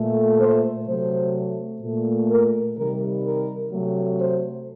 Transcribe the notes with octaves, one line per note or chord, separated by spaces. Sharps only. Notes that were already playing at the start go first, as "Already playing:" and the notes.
Already playing: A#2 A3
C5
C3 F#3 A3 C5
A#2 A3
A#4
C3 D#3 G3 A#4
A#4
C3 F#3 A3
C5